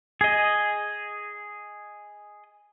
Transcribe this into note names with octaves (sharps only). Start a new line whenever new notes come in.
G#4 D#5